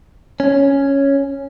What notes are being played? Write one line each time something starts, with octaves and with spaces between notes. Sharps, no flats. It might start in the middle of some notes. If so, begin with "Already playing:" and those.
C#4